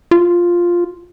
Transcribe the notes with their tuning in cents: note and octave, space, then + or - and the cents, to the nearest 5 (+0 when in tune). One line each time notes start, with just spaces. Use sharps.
F4 +0